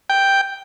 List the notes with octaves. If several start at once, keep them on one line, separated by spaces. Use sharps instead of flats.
G5